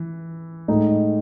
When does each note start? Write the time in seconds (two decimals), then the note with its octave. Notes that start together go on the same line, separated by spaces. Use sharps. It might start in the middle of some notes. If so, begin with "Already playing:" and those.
Already playing: E3
0.68 A2 G#3 D#4